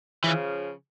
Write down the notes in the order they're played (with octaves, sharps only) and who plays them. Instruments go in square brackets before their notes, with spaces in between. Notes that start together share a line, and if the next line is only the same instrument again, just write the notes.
[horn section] C#3 F3 [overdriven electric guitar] E3